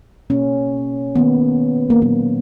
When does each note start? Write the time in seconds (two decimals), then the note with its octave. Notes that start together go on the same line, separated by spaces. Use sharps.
0.30 B2 A#3 C#4
1.15 D#3 A#3 B3
1.90 A#3
2.02 A#2 F#3 A#3 B3